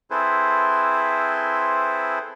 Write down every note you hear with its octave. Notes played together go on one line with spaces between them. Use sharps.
C4 E4 G#4 A4 B4 C5